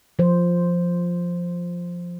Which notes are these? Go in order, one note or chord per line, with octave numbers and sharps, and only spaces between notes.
F3 C5